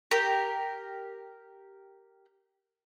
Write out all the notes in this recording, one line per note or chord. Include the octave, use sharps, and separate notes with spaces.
G4 A#4